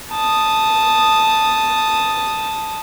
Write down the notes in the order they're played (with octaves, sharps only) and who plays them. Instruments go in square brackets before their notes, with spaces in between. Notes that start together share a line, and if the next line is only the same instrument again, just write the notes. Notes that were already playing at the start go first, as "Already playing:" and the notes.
[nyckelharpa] A5 D#6